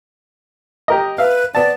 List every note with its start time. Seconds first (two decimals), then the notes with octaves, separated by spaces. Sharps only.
0.88 G4 A#4 D#5
1.18 B4 E5 F5
1.55 B3 D5 A5